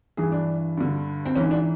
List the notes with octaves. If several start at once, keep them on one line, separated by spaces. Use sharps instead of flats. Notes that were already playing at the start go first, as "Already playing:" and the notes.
G2 E3 G#4
D4
G2 D3
C4
G#2 E3 C#4
D4